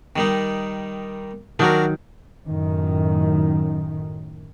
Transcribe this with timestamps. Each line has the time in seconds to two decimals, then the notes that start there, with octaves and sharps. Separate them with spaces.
0.16 D#3 G3 D#4
1.59 D#3 F#3 D4 F#4 A#4
2.47 F#2 A2 D#3